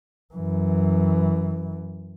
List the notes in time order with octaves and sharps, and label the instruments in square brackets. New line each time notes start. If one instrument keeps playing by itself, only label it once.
[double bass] F#2 E3